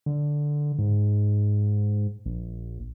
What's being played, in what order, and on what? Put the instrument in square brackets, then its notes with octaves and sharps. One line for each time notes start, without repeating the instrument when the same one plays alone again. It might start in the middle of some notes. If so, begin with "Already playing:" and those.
[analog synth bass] D3
G#2
A#1